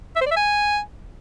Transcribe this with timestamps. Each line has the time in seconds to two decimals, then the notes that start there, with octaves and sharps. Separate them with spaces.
0.16 E5
0.21 C5
0.26 D5
0.31 E5
0.36 G#5